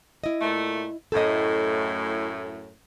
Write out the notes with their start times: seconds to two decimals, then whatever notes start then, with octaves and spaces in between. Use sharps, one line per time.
0.24 E4 D#5
0.41 A#2 A3
1.12 F#2 A2 A4 D#5